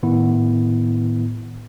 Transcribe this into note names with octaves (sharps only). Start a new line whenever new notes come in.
A2 D#3 B3 E4